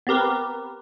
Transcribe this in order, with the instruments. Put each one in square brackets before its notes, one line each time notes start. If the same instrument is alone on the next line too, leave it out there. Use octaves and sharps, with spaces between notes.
[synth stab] B3 C4 G4 A#4 B4